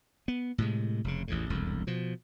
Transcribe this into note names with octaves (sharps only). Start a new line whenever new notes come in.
B3
A2 C3 G#3
F1 G#2 C#3
A1 E2 A2
E1 C2 F2
B2 F3